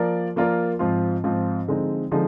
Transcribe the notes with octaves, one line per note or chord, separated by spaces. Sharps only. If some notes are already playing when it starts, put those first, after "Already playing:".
Already playing: F3 A#3 F4 A#4 D5
F3 A#3 F4 A#4 D5
G#2 F3 C4 F4
G#2 F3 C4 F4
D3 F3 G#3 C4 D#4
D3 F3 G#3 C4 D#4